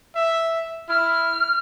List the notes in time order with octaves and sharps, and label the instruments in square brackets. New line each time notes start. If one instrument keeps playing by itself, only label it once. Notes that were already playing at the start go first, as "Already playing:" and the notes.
[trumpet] E5
[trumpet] E4 [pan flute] F6